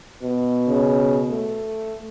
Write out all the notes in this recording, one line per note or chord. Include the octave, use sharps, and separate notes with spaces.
B2
C#3
A3